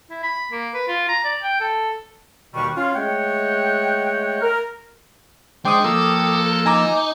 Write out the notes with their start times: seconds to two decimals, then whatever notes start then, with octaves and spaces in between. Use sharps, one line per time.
0.10 E4
0.23 B5
0.52 A#3
0.74 B4
0.88 F4
1.09 A#5
1.24 D5
1.42 G5
1.60 A4
2.54 D#2 B2 D#3 G3 B4 C#6
2.76 C#4 F4
2.94 G#3 A3 C#5 F#5 G5
4.41 A#4
5.65 G#3 D4 C5 G5 D6 D#6
5.84 F3 A#3 A4 E6
6.66 D#4 G#5 A#5 D6